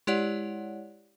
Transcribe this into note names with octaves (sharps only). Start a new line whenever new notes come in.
G#3 E4 G4 C#5 D5 F#5